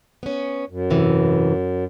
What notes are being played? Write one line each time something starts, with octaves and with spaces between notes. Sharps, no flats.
B3 C#4
F#2
G#2 C3 E3